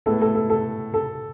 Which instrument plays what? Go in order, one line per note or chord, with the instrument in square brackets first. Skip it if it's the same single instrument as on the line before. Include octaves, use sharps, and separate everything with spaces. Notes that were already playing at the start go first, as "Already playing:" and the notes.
[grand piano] A2 G#3 B3 E4 [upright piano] A4
[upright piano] A4
A4
A4
A4